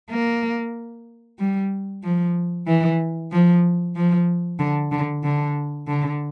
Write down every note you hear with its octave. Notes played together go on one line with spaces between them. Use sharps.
A#3
G3
F3
E3
F3
F3
D3
D3
D3
D3